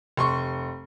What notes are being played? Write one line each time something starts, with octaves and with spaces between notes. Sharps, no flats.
F1 C6 C#6